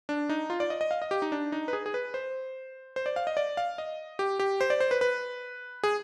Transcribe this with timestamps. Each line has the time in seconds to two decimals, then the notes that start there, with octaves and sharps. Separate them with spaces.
0.09 D4
0.29 D#4
0.50 F4
0.60 D5
0.70 D#5
0.81 D#5
0.91 F5
1.02 D#5
1.11 G4
1.22 D#4
1.32 D4
1.52 D#4
1.68 B4
1.73 G#4
1.86 G#4
1.94 B4
2.14 C5
2.96 C5
3.06 D5
3.16 F5
3.27 D#5
3.37 D5
3.57 F5
3.78 D#5
4.19 G4
4.40 G4
4.61 C5
4.70 D5
4.80 C5
4.91 B4
5.01 B4
5.83 G#4